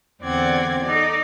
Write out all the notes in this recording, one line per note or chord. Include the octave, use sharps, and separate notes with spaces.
E2 D3 C4 D5 F#5 G#6
D#4 A4 D5